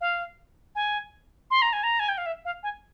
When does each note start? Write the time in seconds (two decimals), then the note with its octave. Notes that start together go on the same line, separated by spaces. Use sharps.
0.01 F5
0.75 G#5
1.51 C6
1.62 A#5
1.73 G#5
1.83 A#5
2.00 G#5
2.09 G5
2.18 F5
2.26 E5
2.45 F5
2.63 G#5